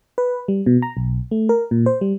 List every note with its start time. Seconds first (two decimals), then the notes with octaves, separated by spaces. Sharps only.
0.18 B4
0.48 G3
0.66 B2
0.82 A#5
0.97 B1
1.31 A3
1.49 A#4
1.71 A#2
1.86 C5
2.01 G3